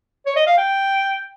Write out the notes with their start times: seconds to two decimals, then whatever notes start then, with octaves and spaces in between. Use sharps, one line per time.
0.26 C#5
0.36 D#5
0.47 F5
0.57 G5